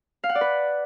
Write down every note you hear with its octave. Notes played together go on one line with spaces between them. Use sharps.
F5
F#5
D5
B4